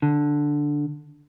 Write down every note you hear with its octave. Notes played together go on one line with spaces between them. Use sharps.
D3